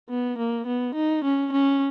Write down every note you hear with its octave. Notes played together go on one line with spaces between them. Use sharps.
B3
A#3
B3
D#4
C#4
C#4